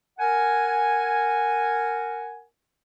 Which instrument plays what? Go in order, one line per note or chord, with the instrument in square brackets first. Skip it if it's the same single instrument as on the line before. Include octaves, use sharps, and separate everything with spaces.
[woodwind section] A#4 F#5 G#5